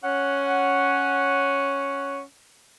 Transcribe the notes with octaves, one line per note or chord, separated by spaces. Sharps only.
C#4 F#5